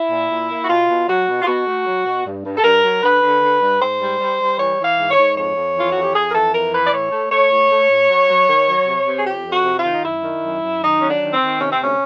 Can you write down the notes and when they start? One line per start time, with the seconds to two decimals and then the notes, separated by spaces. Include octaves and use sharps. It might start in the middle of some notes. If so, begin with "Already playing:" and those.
Already playing: E4
0.11 A#2
0.30 A#2
0.51 A#3
0.63 F#4
0.69 B2 F4
0.89 B2
1.08 F#3 F#4
1.28 B2
1.42 F4
1.47 B2 F#4
1.67 A3
1.86 F#3
2.06 B2
2.25 G2
2.45 G2
2.57 A4
2.64 G2 A#4
2.83 F#3
3.03 D3 B4
3.23 D3
3.42 D3
3.61 G2
3.81 G#2 C5
4.01 G3
4.20 G3
4.39 G3
4.59 E3 C#5
4.79 E3
4.84 F5
4.98 G#2
5.11 C#5
5.17 G#2
5.36 F2 C#5
5.56 F2
5.75 E3 F4
5.91 F2 F#4
6.03 G4
6.14 F2 G#4
6.29 A#4
6.34 E3 A4
6.53 F2 A#4
6.73 E3 B4
6.85 D5
6.92 A2 C#5
7.12 A3
7.31 A3 C#5
7.51 A2
7.70 A3
7.90 A2
8.09 F#3
8.29 F#3
8.48 D#3
8.68 F#3
8.87 C3
9.06 C3
9.19 G#4
9.27 F2 G4
9.46 F2
9.52 F#4
9.65 C3
9.78 F4
9.85 D#3
9.94 D#4
10.04 F#2 E4
10.24 D#3
10.43 F#2
10.63 F#2
10.82 D#3 D#4
11.00 F#3 C#4
11.08 D4
11.21 D#3
11.34 C4
11.40 D#3
11.59 C3 C#4
11.70 C4
11.79 D2 C#4